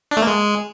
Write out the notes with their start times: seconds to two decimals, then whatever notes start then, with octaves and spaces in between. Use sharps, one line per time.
0.11 D4
0.17 A3
0.22 A#3
0.27 G#3